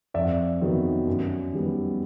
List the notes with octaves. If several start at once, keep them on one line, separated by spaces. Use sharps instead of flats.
F2 D5 E5
C3 D#3 F#3 B3
F#2
D#3 G3 B3